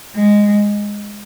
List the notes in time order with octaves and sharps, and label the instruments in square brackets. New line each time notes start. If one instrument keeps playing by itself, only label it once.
[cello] G#3